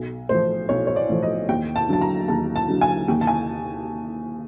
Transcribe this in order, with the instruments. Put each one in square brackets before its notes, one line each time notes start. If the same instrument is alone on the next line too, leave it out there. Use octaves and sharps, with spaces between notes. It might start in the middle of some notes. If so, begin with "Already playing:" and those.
Already playing: [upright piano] B1
A2 F3 C5
B1 C#5
C#5
D5
A2 F3
D#5
D#2 G5
A5
D3 F#3 A5
A#5
D#2 A5
A5
D3 F#3
G#5
D#2 G5
A5
G#5